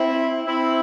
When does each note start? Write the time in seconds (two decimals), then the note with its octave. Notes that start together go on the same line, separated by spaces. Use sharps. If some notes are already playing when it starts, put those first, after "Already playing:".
Already playing: C4 E4
0.47 C4 E4